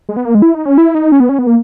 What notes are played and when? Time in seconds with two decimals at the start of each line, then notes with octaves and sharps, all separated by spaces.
0.09 G#3
0.17 B3
0.25 A#3
0.35 G#3
0.42 E4
0.55 D#4
0.66 C#4
0.78 E4
0.95 D#4
1.12 C#4
1.20 B3
1.29 C#4
1.39 B3
1.47 A#3